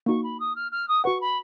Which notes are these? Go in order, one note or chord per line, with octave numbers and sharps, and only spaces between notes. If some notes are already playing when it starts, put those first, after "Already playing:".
A#3 D#4 F#4 C#6
B5
D#6
F6
F6
D#6
F#4 B4 F#5 C#6
B5